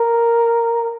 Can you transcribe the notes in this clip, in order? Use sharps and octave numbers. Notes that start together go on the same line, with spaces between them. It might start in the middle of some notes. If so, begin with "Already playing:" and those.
Already playing: A#4